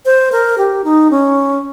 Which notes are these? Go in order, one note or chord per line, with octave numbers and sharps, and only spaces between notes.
C5
A#4
G4
D#4
C#4